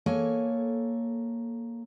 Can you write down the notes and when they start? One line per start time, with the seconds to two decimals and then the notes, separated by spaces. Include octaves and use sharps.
0.06 A#3 A4 C#5 G#5